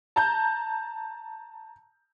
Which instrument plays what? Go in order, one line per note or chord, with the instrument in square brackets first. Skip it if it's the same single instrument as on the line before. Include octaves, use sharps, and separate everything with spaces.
[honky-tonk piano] A5 A#5 G6